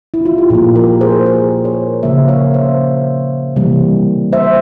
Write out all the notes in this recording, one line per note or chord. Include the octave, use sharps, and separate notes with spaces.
E4
F4
G4
A#2 F3 A#3 F4 G#4
G4 A#4
G#4 C5
G#4 C5
A#4 C#5
C#3 F3 A#3 C5 E5
C#5 F5
C5 E5
C3 E3 G3 A#3
C5 E5